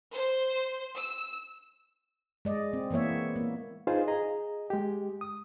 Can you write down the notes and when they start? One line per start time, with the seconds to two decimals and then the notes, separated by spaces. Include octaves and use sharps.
0.12 C5
0.94 E6
2.45 G#3 D5 D#5
2.73 C4
2.91 E3 A#3 B3 C#5 E5
3.36 A#3
3.87 D#4 F4 G#4 B4 C5 F5
4.08 G#4 D#5 A#5
4.70 G#3 G4
5.21 D#6